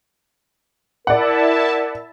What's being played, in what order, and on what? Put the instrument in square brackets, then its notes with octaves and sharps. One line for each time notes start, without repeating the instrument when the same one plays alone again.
[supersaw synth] E4 E5 A5 [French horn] A#4 [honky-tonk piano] D5 F#5